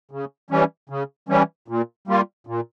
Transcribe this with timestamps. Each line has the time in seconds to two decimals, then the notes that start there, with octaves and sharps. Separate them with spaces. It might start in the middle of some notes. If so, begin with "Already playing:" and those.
0.11 C#3
0.50 E3 G3 C#4
0.89 C#3
1.29 E3 G3 C#4
1.68 A#2
2.07 G3 A#3 F4
2.47 A#2